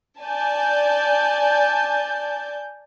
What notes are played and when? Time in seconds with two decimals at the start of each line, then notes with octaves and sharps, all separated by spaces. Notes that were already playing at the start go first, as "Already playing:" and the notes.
0.22 D5 G#5 A5 G6